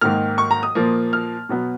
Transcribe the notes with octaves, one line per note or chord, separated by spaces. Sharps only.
G#2 D#3 A#3 F6
C#6
A#5
D#6
A#2 F3 A#3
F6
B2 F#3 B3